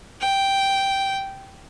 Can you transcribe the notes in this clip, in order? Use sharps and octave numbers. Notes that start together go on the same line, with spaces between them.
G5